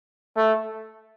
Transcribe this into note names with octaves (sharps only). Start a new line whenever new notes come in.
A3